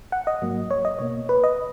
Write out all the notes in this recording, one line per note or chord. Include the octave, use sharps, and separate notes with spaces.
F#5
D#5
G#2 F#3 A#3
C#5
D#5
B2 A#3 C#5
B4
D#5